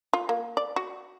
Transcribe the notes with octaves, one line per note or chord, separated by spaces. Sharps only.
F4
A#3
D5
F#4